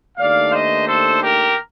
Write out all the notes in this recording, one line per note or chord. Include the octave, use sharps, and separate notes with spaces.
D#2 D#3 A3 D4 D5 F5
C5 D#5
A4 C5
G4 A#4